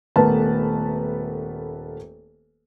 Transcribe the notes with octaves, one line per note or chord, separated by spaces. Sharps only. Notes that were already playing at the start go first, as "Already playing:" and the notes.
D#1 A3 B3 A#4 B4 A5